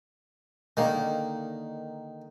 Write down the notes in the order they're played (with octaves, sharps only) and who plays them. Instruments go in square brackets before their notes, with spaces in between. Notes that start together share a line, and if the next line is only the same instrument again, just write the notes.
[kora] D3 A#3 D#4 [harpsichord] D#3